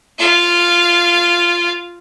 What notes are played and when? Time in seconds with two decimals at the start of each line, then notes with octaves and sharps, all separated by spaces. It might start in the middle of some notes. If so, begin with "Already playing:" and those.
0.19 F4 F5